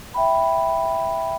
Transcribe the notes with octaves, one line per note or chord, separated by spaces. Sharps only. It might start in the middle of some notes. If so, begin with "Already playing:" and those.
E5 G5 B5